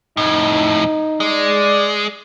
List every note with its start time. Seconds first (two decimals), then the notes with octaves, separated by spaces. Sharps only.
0.17 F2 A2 D#4
1.20 G#3 D5